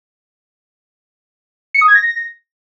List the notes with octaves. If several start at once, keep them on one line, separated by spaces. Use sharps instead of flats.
C#7
D#6
G#6
A#6